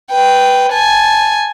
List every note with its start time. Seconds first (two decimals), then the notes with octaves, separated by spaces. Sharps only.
0.11 B4 G5
0.72 G#5 A5